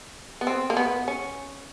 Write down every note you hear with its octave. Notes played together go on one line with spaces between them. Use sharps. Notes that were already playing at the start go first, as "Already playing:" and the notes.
B3
C4
A#3
B3
C#4